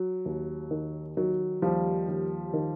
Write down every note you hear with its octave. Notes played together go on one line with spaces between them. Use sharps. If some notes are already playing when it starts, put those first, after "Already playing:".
Already playing: F#3
D#2
D#3
D#3 F#3
D#2 F3 G3
D#2
D#3